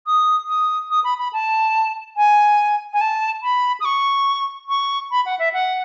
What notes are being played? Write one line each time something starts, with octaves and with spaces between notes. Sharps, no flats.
D#6
D#6
D#6
B5
B5
A5
G#5
G#5
A5
B5
D#6
C#6
C#6
B5
F#5
E5
F#5